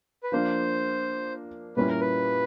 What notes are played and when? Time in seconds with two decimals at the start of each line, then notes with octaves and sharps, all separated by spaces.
0.23 B4
0.32 F3 A#3 D4 C5
1.77 A#2 G3 A#3 C#4 E4 B4
1.88 A#4
2.00 B4